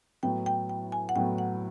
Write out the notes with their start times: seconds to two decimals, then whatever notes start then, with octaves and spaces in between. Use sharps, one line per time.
0.23 A2 F#3 B3 G5
0.46 G5
0.69 G5
0.92 G#5
1.09 F#5
1.16 A2 F#3 B3 G5
1.38 F#5